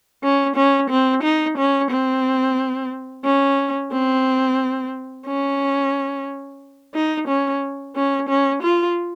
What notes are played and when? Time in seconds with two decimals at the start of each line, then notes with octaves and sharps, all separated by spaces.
0.23 C#4
0.56 C#4
0.90 C4
1.23 D#4
1.58 C#4
1.91 C4
3.25 C#4
3.92 C4
5.26 C#4
6.95 D#4
7.28 C#4
7.96 C#4
8.29 C#4
8.63 F4